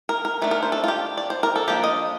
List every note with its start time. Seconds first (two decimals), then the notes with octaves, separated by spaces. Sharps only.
0.09 A#4
0.25 A#4
0.41 D#3 A3 D4
0.51 A#4
0.62 C5
0.72 A4
0.84 F4
0.88 G4
1.17 D5
1.30 C5
1.43 A#4
1.56 A4
1.68 F3 A#3 D4 G4
1.84 D#5